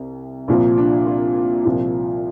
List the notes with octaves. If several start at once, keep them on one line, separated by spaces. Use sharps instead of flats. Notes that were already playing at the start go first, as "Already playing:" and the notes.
Already playing: C2 C3
C2 A#2 F3
D4
F4
C2 A#2 F3